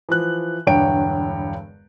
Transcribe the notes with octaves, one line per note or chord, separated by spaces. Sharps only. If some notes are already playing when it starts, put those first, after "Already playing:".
E3 F3 F#6
E1 G2 D3 C#5 G5 D7